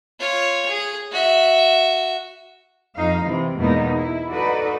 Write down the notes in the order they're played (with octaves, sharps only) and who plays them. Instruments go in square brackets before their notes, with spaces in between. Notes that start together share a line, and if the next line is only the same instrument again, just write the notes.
[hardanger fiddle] F4 C#5
G#4
F#4 E5
[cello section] F2 D#4 F5
C3 E3
E2 B2 G#3 A#3 B3 D#4
E4
D#4 F#4 A4 B4 D5